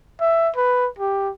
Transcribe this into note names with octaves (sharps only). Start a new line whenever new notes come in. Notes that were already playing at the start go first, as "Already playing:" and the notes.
E5
B4
G4